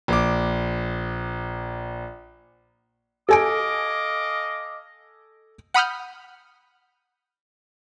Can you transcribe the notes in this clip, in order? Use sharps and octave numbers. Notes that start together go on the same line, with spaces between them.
A#1 D6
A4 D#5 F5 G#5 D6 D7
F#5 B5 D#6 F6 G6